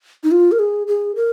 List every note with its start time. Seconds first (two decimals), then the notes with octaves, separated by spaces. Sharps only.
0.24 D#4
0.31 F4
0.52 A#4
0.59 G#4
0.87 G#4
1.16 A#4